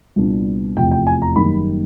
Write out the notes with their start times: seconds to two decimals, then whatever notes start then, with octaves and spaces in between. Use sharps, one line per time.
0.16 C2 A#2 G3 B3 D4
0.76 F1 E2 C3 F3 G5
0.91 G5
1.07 G#5
1.22 A#5
1.36 F#1 F#2 D#3 G3 A#3 B5